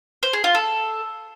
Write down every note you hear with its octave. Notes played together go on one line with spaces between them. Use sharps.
C5
G#4
F4
A4